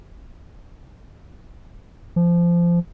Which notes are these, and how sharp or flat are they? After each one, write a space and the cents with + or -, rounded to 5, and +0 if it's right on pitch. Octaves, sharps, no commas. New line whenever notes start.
F3 -20